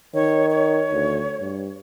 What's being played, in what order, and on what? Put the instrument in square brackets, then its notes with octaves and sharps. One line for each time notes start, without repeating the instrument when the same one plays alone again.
[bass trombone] D#3 [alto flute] C#5
[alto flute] C#5
[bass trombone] D2
G2